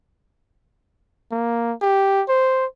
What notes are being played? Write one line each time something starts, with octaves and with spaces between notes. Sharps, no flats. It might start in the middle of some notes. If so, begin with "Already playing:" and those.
A#3
G4
C5